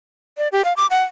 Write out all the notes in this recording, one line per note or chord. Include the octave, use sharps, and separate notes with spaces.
D5
G4
F5
D6
F#5